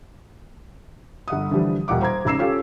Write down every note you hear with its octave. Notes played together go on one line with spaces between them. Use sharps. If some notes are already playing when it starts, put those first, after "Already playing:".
G1 F#5 D#6
D3 E3 F3 G3
D#1 D#2 D#4 F#5 D6
C5 A#5 G#6
G#1 C#3 A#5 E6 C7 E7
C#4 F4 G4 A4 F5